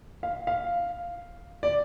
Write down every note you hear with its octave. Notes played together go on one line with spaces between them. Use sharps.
F5
F5
D5